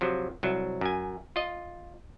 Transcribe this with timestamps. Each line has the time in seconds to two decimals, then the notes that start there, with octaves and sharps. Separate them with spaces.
0.01 C3 F3 F#3
0.43 C2 F#3
0.81 F#2 G#5
1.36 F4 D#5